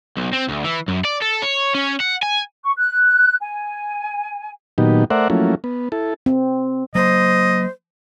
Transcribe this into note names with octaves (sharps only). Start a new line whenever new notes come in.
B1
C4
D2
E3
F#2
D5
A4
C#5
C#4
F#5
G#5
C#6
F#6
G#5
A#2 D#3 F#3 B3 D#4 G4
A3 A#4 C5 D5 E5 F#5
F3 F#3 A3 A#3 C#4 E4
B3
E4 A4
C4
F#3 A#3 C5 D#5